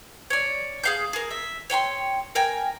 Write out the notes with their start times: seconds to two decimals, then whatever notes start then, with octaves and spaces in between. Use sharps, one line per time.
0.30 C#5 D5
0.83 G#4 F5 G6
1.13 G#4 A#4
1.31 E5
1.70 C#5 G5 A5 C6
2.35 A#4 G5 G#5